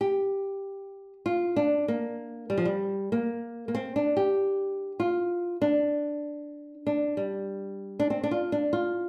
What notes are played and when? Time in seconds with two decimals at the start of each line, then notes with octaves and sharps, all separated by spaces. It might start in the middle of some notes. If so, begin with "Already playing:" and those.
0.01 G4
1.26 F4
1.56 D4
1.88 A#3
2.50 G3
2.58 F3
2.65 G3
3.12 A#3
3.68 A#3
3.75 C4
3.96 D4
4.17 G4
5.00 F4
5.62 D4
6.87 D4
7.17 G3
8.00 D4
8.10 C4
8.23 D4
8.31 F4
8.52 D4
8.73 F4